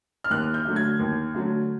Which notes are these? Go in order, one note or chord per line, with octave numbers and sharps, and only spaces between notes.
F6
D#2 F#6
G6
D3 F#3 A3
G#6
D#2
D3 F#3 A3